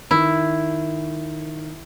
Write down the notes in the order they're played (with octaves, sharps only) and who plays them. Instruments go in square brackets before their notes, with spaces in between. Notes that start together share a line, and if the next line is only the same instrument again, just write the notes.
[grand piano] D#3 [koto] E4